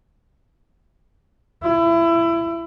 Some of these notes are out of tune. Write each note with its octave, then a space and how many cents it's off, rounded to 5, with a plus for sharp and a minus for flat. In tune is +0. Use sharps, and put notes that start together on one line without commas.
E4 +25